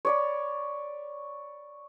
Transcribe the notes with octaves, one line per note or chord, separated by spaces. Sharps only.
C#5 D5 B5